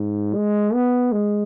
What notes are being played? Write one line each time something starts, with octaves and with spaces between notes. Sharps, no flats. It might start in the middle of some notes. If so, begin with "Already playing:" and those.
Already playing: G#2
G#3
B3
G#3